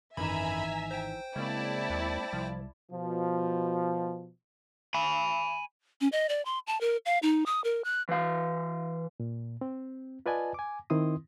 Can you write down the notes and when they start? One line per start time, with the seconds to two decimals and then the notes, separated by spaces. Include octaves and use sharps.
0.17 G#1 F#2 E3 D#4 E5 G#5 A#5 B5
0.91 C5 G5
1.36 C#3 G#3 A#3 C4 E4 D5 A5
1.90 D#2
2.33 C2 F3
2.91 B2 F3
4.94 G#5 B5
6.01 C#4
6.12 D#5
6.29 D5
6.45 C6
6.67 A5
6.81 A#4
7.06 F5
7.23 D#4
7.46 D#6
7.64 A#4
7.84 F#6
8.09 E3 F5
9.20 A#2
9.61 C4
10.26 F4 B4 D5 D#5 G#5 A5
10.54 G#5 D6
10.90 D#3 C4 E4 C6 D#6